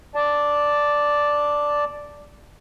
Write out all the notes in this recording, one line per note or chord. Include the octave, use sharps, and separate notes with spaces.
D5 A5